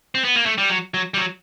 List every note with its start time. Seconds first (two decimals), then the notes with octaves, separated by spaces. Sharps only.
0.15 C4
0.24 B3
0.36 A#3
0.46 A3
0.58 G3
0.70 F#3
0.94 F#3
1.14 G3
1.17 F#3